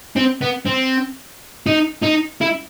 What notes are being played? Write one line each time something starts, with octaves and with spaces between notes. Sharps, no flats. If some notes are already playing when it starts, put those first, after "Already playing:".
C4
B3
C4
D#4
D#4
E4